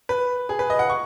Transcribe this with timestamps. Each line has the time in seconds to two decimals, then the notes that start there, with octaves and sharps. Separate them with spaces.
0.09 B4
0.49 G#4
0.59 B4
0.70 D#5
0.79 F#5
0.90 C#6